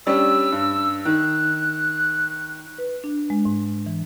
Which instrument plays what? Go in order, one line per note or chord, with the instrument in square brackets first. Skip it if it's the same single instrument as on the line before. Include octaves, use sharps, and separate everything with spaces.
[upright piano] G3 C#4 D4 [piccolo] E6
[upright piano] G2
[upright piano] D#3 [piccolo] F#6
[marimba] B4
D4
G#3
G#2
E3